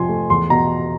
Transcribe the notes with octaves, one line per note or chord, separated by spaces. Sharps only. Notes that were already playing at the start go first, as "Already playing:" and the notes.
Already playing: F2 C3 F3 G#5 C6
A3
E2 C6
B2 A#5